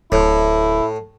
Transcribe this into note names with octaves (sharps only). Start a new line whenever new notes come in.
D1 A2 E4